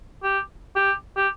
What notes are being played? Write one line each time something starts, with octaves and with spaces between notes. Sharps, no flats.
G4
G4
G4